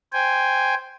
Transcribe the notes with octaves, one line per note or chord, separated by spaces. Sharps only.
C5 G5 G#5